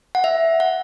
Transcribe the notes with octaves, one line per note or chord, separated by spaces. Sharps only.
F#5
E5
F#5